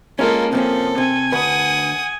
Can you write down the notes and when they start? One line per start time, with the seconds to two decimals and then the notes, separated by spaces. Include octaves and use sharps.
0.19 G#3 A#3 C#4 F4 A4
0.53 C3 F3 A#3 C#4 A4
0.98 C3 G#5
1.32 D2 B4 F#5 D#6